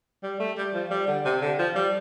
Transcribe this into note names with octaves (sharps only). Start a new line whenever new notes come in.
G3
A3
G3
F3
G3
D3
C3
D3
F3
G3